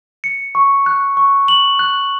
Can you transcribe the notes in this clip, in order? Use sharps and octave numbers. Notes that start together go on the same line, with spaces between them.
C#7
C#6
F#6
C#6
F#7
F#6